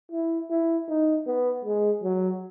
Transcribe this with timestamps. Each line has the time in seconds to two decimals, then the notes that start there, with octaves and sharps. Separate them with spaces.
0.12 E4
0.50 E4
0.88 D#4
1.27 B3
1.65 G#3
2.03 F#3